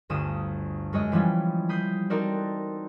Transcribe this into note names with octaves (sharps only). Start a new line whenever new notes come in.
G1 D2 G2 D#6 E7
F#2 G#3 C#5 D#5
E3 F3 G3 B3 C#4
B5 D#6 G6 C7
C4 D#4 F#4 A4 A#4 D5